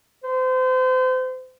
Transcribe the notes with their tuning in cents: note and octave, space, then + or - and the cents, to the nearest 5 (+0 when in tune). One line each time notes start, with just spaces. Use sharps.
C5 -35